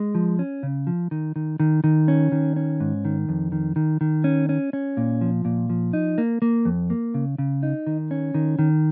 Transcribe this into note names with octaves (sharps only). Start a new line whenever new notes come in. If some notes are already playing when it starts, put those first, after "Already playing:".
Already playing: G#3
F3
C#4
C#3
F3
D#3
D#3
D#3
D#3
C#4
D#3
C#4
G#2
D#3
F2
D#3
D#3
D#3
C#4
C#4
C#4
A#2
F3
A#2
F3
D#4
A#3
A#3
F2
A#3
C#3
C#3
D#4
D#3
C#4
D#3
D#3